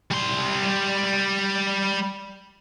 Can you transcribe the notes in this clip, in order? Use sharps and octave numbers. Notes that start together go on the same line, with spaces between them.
G3 C6